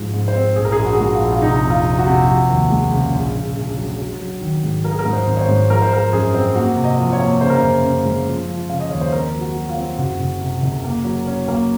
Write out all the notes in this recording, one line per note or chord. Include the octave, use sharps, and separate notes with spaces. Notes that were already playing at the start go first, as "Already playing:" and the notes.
Already playing: G#2 F3
G#2
C5
C4
A#1 G#4
A#4
G#4
A#1
F#4
G#4
G#3 F#4
F4
A#1
F4
C3 D#4
F2
F4
C3
F#4
C3
F3 F#4
D#2
G#3
C#3
A#1
A#1
A#1
F#3
F#3
F#3
D#3
G#2
F#3 A#4
G#4
A#4
G#2
C5
G#1
C#5
C5
G#2
F3 A#4
C5
F3 A#4
F#2 G#4
C4
A#3 F#4
C3
D#5
F3
C#5
A#3
C#3 C5
A#4
F#2 C5
F#2
G#3
F3
F3
C#3 F5
D#5
D#2 C#5
C5
C4 A#4
F#3
F#4
F#3
F4
C4
F#1 F#4
F#1
C3
F#1
A#3
F#3
C#4
A#3